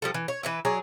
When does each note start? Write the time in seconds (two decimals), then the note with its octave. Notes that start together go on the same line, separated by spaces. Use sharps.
0.02 F3 G3 A4
0.14 E3
0.28 C#5
0.43 E3 B4 E5
0.65 F#3 G#4 C#5 D5